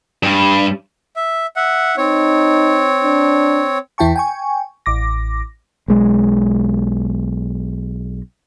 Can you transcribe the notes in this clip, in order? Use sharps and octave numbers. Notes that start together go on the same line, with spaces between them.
G2
E5
E5 F#5
C4 D#4 C#5
D4
E2 E3 E4 G5 A5 C#6
G5 G#5 C#6
A1 D6 A#6
B1 G#3